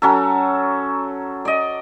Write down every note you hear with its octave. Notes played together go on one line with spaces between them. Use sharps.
F#3 C#4 A4
D5 D#5